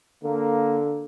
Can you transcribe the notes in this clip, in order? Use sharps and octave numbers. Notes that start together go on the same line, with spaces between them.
D3 A#3